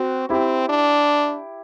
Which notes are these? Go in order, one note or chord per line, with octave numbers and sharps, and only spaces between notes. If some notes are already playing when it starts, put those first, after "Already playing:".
Already playing: C4 F#4
C4 E4 G4
D4